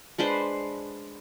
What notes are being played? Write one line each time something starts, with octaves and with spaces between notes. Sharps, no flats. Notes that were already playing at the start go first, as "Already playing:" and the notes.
G#3 D4 B4 C5